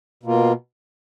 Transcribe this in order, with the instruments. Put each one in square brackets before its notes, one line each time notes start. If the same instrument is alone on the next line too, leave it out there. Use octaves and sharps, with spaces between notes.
[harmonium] B2 A#3 F4